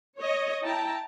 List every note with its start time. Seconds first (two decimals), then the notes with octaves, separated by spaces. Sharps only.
0.18 C#5 D#5
0.64 E4 G5 A5 A#5